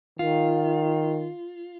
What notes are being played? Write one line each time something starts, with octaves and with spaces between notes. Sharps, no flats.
D#3 F4